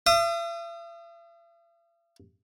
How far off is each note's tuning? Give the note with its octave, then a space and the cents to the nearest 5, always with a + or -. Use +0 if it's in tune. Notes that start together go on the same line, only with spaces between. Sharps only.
E5 +45 D#6 -25